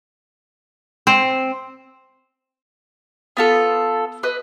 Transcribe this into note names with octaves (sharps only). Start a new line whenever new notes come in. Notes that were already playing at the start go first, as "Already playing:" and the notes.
C4
B3 F4 A4
B4 D#5